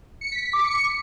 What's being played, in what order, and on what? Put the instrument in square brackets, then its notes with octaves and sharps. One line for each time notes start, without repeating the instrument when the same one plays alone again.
[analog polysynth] C#7
B6
B6
D6
C#7